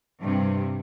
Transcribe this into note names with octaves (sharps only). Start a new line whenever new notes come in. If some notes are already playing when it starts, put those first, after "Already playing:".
G2 C3